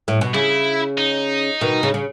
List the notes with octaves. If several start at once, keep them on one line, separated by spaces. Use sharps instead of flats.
A2
B2
C#3 E4
D#4
B2 D#3
C#3
C#3